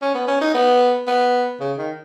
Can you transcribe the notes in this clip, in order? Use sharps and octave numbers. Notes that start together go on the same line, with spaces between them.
C#4
B3
C#4
D#4
B3
B3
C#3
D#3